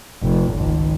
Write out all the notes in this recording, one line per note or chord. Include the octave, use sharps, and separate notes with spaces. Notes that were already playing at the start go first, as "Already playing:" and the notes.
F1
G#1 C#2